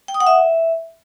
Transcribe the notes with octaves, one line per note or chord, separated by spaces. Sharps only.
G5
D#6
F#5
E5